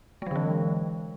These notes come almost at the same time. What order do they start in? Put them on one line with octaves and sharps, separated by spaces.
G#3 F#3 D3 E3